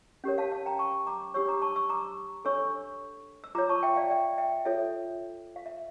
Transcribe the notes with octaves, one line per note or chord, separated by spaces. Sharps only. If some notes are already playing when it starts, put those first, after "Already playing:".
C#4 G4 A#4 C#5
F5 A5
F5 A5
G5 A#5
A5 C#6
A#5 D6
D4 G4 C#5 C#6 E6
A#5 D6
A5 C#6
C#6 E6
A#5 D6
D4 A4 C#5 C#6 E6
E6
F4 C#5 A#5 D6
A5 C#6
E5 G5
D5 F5
E5 G5
E5 G5
F4 A4 C#5 E5
F5
E5